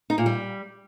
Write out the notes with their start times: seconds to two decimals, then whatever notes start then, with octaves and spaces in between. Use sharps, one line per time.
0.10 D#4
0.18 A#2
0.26 G3